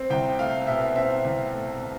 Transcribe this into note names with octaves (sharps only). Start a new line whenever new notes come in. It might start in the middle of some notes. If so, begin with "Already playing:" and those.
Already playing: C4
C2 G5
A3 F5
B2 E5
C4 E5
C2
A3
B2